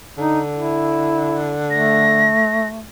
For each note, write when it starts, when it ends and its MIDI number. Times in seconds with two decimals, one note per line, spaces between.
0.18 2.34 50
0.18 0.40 63
0.53 1.57 64
1.71 2.88 57
1.71 2.68 94